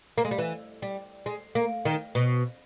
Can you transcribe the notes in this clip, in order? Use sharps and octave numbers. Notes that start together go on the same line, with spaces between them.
A#3
G#3
G3
E3
G3
G#3
A#3
D#3
B2